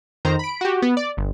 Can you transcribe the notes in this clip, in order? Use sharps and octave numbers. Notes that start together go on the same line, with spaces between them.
F2 D#3 C5 A#5
B5 D7
F#4 G4
B3
D5
G1